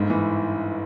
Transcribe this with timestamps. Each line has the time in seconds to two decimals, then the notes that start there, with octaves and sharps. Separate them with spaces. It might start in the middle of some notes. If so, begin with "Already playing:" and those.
Already playing: G1 G#2
0.10 E3